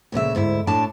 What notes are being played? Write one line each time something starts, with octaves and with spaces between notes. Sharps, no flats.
D2 A#2 C#3 E5
D2 G#2 E4 E5
A2 D4 D5 A5